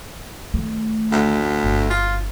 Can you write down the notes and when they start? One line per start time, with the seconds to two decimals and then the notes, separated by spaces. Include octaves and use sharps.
0.54 D#3 A3
1.12 D2
1.63 G1
1.90 F4